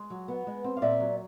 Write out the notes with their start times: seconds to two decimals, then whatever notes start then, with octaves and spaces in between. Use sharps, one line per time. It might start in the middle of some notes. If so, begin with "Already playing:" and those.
Already playing: G#3
0.10 F#3
0.28 B3
0.47 G#3
0.64 C4
0.77 F5
0.82 A#2 D5 E5
1.00 F#3